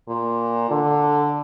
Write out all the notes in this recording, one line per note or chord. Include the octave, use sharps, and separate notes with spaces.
A#2
D3